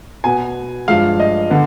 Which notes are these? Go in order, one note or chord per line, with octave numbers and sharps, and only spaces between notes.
B2 B3 G#5
G2 F3 G#3 F5
D#5
D3 B3